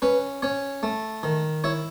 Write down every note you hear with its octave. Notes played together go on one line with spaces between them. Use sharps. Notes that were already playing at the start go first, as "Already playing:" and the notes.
C#4 B4
C#4 C#5
A3
D#3
E4 C#5